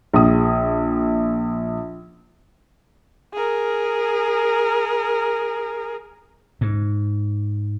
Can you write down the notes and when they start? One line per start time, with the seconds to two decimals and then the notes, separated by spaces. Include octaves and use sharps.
0.14 A#1 D#6
3.33 G#4 A#4
6.61 G#2